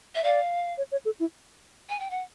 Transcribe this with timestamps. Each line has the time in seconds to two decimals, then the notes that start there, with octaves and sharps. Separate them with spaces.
0.14 E5
0.23 D5 F5
0.78 C#5
0.92 C#5
1.05 A4
1.20 E4
1.89 G#5
1.99 G5
2.10 F#5